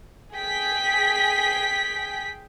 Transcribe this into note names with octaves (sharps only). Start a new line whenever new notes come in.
G#4 G5 B6